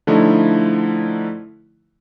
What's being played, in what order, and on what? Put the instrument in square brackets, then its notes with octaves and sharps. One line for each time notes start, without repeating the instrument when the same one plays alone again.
[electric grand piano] D3 F3 A3 D#4 E4